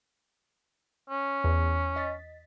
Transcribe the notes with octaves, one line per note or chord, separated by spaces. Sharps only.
C#4
E2
D#5 A6 B6